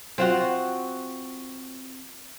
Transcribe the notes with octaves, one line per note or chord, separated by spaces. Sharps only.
C4 F4 F#4